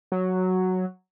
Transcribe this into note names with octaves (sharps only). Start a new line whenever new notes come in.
F#3